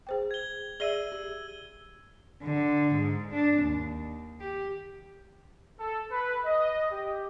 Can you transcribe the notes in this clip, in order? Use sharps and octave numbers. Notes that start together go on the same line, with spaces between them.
G#4 C5 G5
G#6 G7
G#4 D5 E5 E6 D#7 G7
G4
D3
G#2
D4
D#2
G4
A4
B4
D#5
G4